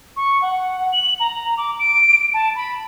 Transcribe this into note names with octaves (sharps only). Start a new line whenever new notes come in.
C#6
F#5
F#7
A#5
D6
D7
A5
B5